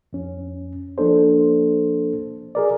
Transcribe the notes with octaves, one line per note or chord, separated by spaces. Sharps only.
F2 C#4
F3 A#3 D4 A4 C5
G#4 A#4 D5